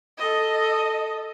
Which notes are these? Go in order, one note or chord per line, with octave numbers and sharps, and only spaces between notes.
A4 D#5